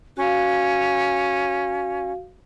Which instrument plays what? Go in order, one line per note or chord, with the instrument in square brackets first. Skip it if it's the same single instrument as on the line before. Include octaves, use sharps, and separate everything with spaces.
[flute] C#4 [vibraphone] F#4 F5